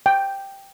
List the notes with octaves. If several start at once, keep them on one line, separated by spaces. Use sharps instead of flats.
G5